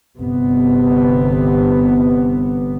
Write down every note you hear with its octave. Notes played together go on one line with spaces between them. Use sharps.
G1 C3 B3